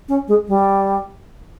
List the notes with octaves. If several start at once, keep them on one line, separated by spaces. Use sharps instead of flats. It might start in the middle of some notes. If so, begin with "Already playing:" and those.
C#4
G#3
G3